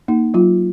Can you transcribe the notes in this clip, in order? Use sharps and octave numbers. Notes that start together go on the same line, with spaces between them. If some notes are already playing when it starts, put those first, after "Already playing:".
A#3 D#4
F#3 F4